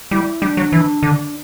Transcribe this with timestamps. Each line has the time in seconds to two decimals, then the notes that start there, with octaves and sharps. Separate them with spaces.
0.11 G3 E4
0.41 G3 D4
0.57 F#3
0.72 E3
1.03 D3